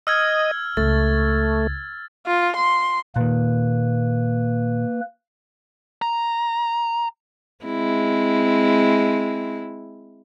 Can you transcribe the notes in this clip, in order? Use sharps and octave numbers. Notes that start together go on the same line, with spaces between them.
D#5 E6 F6 G#6
C#2 A3 A6
F4
C6
A#2 D#3 A#3 B4
A#5
G#3 C4 E4